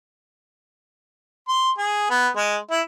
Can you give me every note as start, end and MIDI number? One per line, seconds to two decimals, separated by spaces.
1.48 1.69 84
1.78 2.09 68
2.10 2.28 59
2.36 2.57 56
2.71 2.81 64